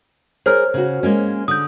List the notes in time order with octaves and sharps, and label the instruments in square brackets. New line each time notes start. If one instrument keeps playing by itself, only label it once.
[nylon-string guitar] G#4 A#4 [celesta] C5 C#5 F6
[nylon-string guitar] C#3 F#4
G#3 A#3 C#4
[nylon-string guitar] D3 [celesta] D#6 G6